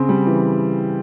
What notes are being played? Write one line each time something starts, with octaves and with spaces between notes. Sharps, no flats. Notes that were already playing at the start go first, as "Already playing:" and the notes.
Already playing: C#3 C4
G3
E3